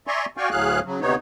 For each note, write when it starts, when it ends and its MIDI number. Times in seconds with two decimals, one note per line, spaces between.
0.07 0.26 74
0.07 0.26 76
0.07 0.26 80
0.07 0.26 82
0.07 0.26 84
0.07 0.26 85
0.37 0.49 66
0.37 0.49 74
0.37 0.49 77
0.37 0.49 79
0.37 0.49 80
0.37 0.49 85
0.51 0.80 38
0.51 0.80 45
0.51 0.80 54
0.51 0.80 68
0.51 0.80 77
0.51 0.80 90
0.85 1.00 49
0.85 1.00 54
1.01 1.15 38
1.01 1.15 48
1.01 1.15 59
1.01 1.15 63
1.01 1.15 73